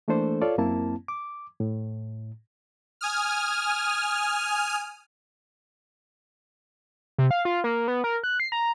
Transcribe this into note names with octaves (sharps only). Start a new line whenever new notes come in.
E3 A3 A#3 D4 A4 C5
F4 A4 C#5 D5 F5
F#2 A#3 C4 E4 A5
D6
A2
G#5 D#6 F6
C3
F5
F4
A#3
B3
A#4
F#6
C7
A#5